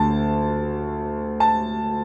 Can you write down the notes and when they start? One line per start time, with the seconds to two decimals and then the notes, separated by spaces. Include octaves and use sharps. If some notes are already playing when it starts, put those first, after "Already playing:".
Already playing: D2 D3 A3 A5
1.40 A5